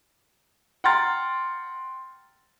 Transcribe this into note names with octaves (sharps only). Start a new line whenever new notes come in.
F#5 G5 A#5 C6 F6 A6